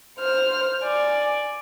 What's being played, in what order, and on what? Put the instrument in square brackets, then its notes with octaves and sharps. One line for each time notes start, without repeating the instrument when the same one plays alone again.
[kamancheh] C5 F6
D5 G#5